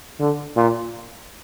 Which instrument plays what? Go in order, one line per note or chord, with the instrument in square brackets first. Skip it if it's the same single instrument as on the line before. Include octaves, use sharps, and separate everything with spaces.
[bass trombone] D3
A#2